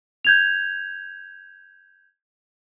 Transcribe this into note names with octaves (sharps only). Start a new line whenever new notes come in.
G6 G#6 F7